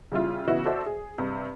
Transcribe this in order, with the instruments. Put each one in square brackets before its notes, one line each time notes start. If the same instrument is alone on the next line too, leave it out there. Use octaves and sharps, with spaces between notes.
[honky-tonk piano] C#3 G3 E4 F4
C#3 E3 B3 E4 F#4
F#4 A4 C5 D5 E5
G#4
G2 C3